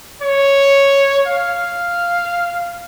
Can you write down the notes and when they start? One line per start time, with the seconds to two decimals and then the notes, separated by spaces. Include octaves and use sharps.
0.22 C#5
1.28 F5